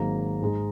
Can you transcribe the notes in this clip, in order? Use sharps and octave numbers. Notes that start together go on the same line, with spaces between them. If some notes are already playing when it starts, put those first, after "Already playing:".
Already playing: G#1 G#2 F#3 A#3 A#5
G#2 G#3 D#4